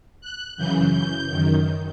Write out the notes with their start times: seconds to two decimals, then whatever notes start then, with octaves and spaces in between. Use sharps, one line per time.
0.21 F#6
0.57 F#2 C#3 E3 G6
0.93 G6
1.30 F#2 D#3